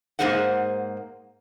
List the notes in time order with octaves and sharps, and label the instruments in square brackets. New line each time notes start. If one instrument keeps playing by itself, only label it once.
[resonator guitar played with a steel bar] G#2 F#3 A#3 G#4 C5 F#5